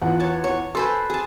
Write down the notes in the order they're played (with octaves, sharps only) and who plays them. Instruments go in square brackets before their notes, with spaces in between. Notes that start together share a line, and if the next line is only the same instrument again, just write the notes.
[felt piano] E2 F4 F#5
[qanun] C#5 A5
C#5
[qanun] A4 B4 C5 [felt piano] G#5 C6
[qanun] G#4 A5